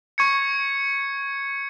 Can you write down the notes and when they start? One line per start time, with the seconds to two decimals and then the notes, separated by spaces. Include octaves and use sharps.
0.18 C#6 G#6 C#7